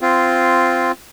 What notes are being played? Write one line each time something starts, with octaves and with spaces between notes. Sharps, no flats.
C4 F4